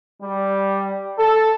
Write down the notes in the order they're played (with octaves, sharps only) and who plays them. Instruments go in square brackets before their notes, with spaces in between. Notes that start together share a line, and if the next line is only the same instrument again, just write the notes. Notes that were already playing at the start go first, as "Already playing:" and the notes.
[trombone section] G3
A4